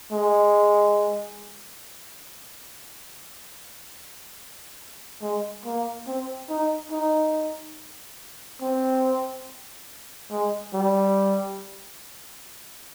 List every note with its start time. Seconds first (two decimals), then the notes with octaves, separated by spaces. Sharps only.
0.12 G#3
5.22 G#3
5.65 A#3
6.07 C4
6.49 D#4
6.92 D#4
8.62 C4
10.31 G#3
10.74 G3